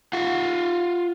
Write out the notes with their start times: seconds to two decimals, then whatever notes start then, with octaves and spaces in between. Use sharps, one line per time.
0.13 F4 F#5